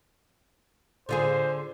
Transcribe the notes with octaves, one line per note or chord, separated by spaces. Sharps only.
D3 F4 G#4 C5